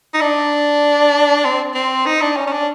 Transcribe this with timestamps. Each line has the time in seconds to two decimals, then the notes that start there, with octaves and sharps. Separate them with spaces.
0.14 D#4
0.21 D4
1.45 C4
1.75 C4
2.06 D#4
2.22 D4
2.36 C#4
2.47 C#4
2.52 D4